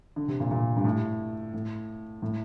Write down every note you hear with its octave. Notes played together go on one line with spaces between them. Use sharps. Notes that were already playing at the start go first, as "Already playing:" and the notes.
D3
C3
A#2
A#2
G2
A2
A2
A2